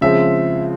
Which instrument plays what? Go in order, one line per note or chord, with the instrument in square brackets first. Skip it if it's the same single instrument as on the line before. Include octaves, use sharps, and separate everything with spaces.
[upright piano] C#3 F3 G#3 C4 [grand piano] E5